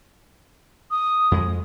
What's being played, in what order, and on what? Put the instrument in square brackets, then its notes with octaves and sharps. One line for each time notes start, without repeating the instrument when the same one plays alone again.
[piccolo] D#6
[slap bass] F2 G#3